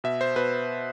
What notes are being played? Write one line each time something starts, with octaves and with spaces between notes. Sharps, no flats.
B2 E5
C5
B2 B4